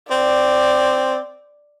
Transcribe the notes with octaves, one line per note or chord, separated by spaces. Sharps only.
C4 D5